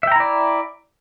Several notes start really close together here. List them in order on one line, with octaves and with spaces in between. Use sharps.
E5 G5 A#5 E4 D5